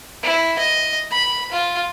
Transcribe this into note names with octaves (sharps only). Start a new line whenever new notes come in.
E4
D#5
B5
F4